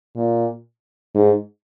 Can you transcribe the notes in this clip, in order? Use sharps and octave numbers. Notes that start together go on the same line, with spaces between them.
A#2
G#2